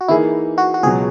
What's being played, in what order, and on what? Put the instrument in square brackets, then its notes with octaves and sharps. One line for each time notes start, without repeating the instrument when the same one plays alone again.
[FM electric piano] F#4
[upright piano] E3 A#3 D#4 G#4 [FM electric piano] E4
[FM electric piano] F#4
F#4
[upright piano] C#2 B2 F#3 [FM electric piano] G#4